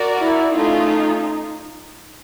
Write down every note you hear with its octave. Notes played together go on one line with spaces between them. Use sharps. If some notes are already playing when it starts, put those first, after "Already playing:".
Already playing: F#4 A#4 D5
E4
A3 C#4 D#4 F4